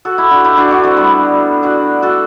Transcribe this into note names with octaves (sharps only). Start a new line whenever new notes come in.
F#4 A4
E4 G4
D4 F#4
E4 G4
D4 F#4
D4 F#4
A3 C4
G3 B3
D4 F#4
F#4 A4